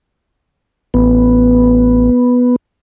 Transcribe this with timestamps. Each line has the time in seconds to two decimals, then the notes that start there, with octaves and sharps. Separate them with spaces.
0.94 A1 B3